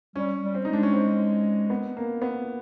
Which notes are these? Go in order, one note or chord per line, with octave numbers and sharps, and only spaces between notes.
G3 C#4
G3
C4
G#3 D#4
D4
C#4
C4
B3
A#3
B3